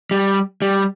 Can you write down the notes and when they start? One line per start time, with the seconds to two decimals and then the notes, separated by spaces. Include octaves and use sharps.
0.11 G3
0.62 G3